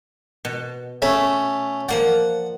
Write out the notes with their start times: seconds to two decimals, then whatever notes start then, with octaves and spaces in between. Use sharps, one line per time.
0.45 B2
1.02 A3 C#4 E5
1.89 F3 A#3 D5 F#5